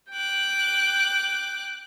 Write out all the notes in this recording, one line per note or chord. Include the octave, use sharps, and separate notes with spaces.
G5 D6 F#6